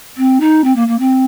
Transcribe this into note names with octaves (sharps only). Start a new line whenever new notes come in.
C4
D#4
C4
A#3
A#3
C4